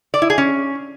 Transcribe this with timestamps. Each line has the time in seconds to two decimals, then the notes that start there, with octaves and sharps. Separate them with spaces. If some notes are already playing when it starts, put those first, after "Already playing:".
0.14 D5
0.22 E4
0.30 G#4
0.38 C#4